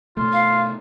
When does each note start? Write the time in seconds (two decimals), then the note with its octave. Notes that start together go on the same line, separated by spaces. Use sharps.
0.17 B2 A3 F4
0.32 F5